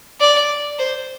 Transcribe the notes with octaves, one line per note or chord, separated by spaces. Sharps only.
D5
C5